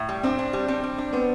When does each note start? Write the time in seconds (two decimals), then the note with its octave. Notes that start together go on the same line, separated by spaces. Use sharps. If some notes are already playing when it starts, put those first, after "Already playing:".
Already playing: A2
0.09 G3
0.23 C4 D4
0.39 D4
0.53 G3
0.68 G3 C4
0.83 G3
0.98 D4
1.13 B3 C4